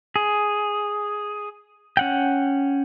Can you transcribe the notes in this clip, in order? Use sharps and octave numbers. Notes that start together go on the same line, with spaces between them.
G#4
C#4 F#5 G5